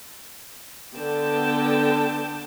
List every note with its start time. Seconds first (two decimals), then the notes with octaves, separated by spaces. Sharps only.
0.95 D3 B3 G5 A5